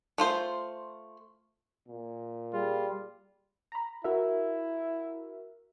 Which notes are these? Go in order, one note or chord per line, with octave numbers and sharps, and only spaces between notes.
A3 F4 C5
A#2
G3 F4 G#4
A#5 B5
E4 F#4 A#4 E5